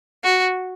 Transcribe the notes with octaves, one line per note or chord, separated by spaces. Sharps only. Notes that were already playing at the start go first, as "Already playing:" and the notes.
F#4